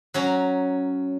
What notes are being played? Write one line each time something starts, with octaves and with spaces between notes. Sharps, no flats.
F#3 C#4 A#5